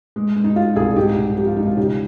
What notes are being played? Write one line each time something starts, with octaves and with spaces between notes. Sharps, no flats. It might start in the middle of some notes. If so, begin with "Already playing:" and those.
G#3
G#3
D#4
G#3 F4
C2 F4 G#4
G#2 D#4 G4
G#2
F3 G4
F4
G#3 D#4
F4
C#3 D#4 G4